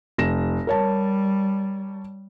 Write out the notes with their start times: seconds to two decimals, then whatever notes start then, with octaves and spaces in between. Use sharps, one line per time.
0.18 F1 A#6 E7
0.67 G3 A#4 C#5 A5